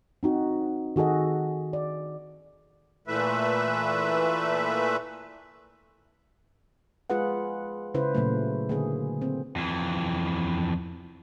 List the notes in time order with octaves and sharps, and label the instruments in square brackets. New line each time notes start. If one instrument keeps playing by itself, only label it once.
[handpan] C4 D#4 F#4
D#3 F#4 G#4 A4 D#5
D5
[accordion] A#2 E3 A3 B4 E5
[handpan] G#3 F4 G#4 B4 F#5
C#3 E4 B4 C5
A#2 C#3 F#3 A3
D3 A#3 G#4
C4
[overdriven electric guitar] F2 E3